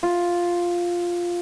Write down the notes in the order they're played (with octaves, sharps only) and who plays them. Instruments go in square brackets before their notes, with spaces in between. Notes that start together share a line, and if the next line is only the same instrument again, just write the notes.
[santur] F4